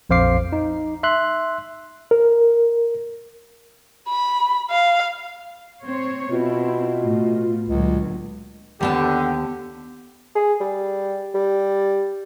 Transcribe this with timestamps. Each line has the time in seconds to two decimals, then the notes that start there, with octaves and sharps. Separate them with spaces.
0.10 A#1 F2 C5 F5 D6 C7
0.53 D#4
1.03 E5 C6 F#6
2.11 A#4
4.08 B5
4.70 F5
5.85 C4 C5 C#5
6.30 B2 C4 E4 F4
7.04 A2
7.69 C#2 A#2 D3 F#3
8.81 D#2 D3 B3 G4 A5
10.35 G#4
10.61 G3
11.34 G3